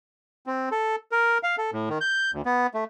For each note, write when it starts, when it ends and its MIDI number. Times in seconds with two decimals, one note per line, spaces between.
0.47 0.69 60
0.72 0.96 69
1.12 1.38 70
1.43 1.56 77
1.58 1.71 69
1.73 1.89 45
1.90 1.98 51
2.01 2.31 91
2.33 2.42 38
2.46 2.67 59
2.74 2.84 57